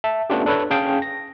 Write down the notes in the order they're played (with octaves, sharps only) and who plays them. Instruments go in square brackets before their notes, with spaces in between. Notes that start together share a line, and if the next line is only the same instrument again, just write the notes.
[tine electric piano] E5 A5
A3 B3 C#4 D4 F4 G4
D4 A4 B4 C#5
C#4 G#4 F5 G5 A5
A#6